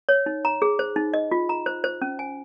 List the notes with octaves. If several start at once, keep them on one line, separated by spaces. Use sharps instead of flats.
C#5
D#4
A#5
G#4
C5
D#4
D#5
F4
A#5
C5
C5
C#4
G#5